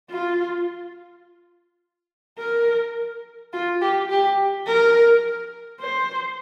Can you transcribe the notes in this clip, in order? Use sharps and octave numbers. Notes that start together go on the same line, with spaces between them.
F4
A#4
F4
G4
G4
A#4
C5